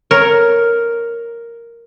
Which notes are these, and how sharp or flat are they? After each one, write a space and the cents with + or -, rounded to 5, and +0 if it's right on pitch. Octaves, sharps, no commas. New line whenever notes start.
A#4 +0 C#5 +0